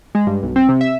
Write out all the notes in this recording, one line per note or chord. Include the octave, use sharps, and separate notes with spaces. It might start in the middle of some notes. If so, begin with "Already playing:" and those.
G#3
G2
B1
C4
C3
E5